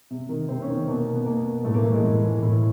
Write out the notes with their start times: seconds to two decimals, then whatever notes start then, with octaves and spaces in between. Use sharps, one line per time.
0.11 C3
0.29 D#3
0.49 C3 C4
0.62 C#4
0.68 D#3
0.74 C4
0.87 B2 A#3
1.13 B3
1.26 B2 A#3
1.64 A2 A3
1.74 A#3
1.84 E3 A3
1.94 G#3
2.03 A2
2.23 E3
2.42 A2